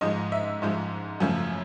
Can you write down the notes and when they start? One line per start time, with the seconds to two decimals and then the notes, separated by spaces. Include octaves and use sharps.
0.01 G#2 F3 G#3 D#5
0.32 E5
0.62 G#2 F3 G#3
1.20 F#2 C#3 F3 A3